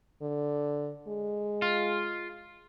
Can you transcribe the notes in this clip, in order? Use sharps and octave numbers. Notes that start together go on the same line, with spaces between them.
D3
G#3
F4